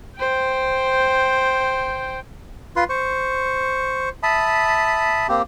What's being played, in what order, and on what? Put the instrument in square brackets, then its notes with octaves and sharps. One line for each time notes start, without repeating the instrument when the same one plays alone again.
[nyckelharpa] C5 G5
[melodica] F4 B4 C6
C5 C#6
E5 A5 B5 D#6
A#3 C4 G4